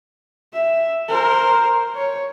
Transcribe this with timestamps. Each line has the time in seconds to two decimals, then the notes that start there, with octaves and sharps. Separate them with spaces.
0.54 E5
1.09 A#4 C5
1.96 C#5